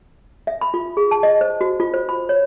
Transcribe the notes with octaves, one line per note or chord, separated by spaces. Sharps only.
E5
B5
F4
G#4
A5
D#5
C5
F#4
F4
C5
B5
C#5